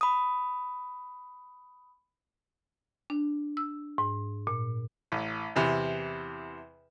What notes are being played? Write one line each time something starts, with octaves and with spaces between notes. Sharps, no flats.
B5 D#6
D4
E6
G#2
A#2
A1
E2 C3 E3